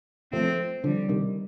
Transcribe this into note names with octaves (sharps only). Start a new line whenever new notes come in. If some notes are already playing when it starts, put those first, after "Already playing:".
F3 A3 C4
D3 F3 G3
C3 D#3